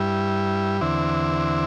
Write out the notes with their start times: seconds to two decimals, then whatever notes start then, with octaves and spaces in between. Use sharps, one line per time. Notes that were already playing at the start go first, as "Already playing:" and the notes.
Already playing: G2 G3 E4
0.81 E2 D3 C4 E4